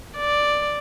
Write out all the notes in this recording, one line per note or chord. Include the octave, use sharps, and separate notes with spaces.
D5